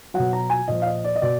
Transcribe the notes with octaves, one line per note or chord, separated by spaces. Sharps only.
B2 F#3 F#5
A#5
G#5
A#2 F3 D#5
F5
D#5
D5
D#5
B2 D5